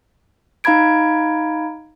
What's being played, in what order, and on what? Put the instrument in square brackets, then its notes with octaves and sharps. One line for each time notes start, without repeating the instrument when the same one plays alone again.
[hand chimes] D#4 F5 A#5 B5 G#6 D7